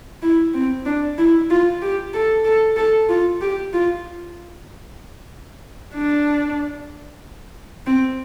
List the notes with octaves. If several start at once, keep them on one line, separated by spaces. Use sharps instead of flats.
E4
C4
D4
E4
F4
G4
A4
A4
A4
F4
G4
F4
D4
C4